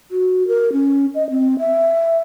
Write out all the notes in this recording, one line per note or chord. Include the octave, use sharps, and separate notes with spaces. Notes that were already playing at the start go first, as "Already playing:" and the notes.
F#4
A#4
C#4
D#5
C4
E5